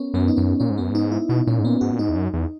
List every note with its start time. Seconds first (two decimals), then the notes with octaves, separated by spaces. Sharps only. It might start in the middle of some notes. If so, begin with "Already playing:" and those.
Already playing: B3 C#4 A#4
0.14 F#2 B3
0.28 D#4
0.37 F#2 C#4
0.60 A#2 C#4
0.70 G#2
0.78 F#2 B3
0.90 G#2
0.95 D#4
1.12 E4
1.29 B2 D#4
1.47 A#2 C#4
1.59 G#2
1.65 A#2 B3
1.81 G#2 F#4
1.91 A#2
1.99 G#2 D#4
2.09 E2
2.16 F#2
2.34 E2